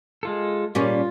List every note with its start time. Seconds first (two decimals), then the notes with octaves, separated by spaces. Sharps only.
0.23 G#3 F4 A4
0.75 A#2 G3 C#4 F4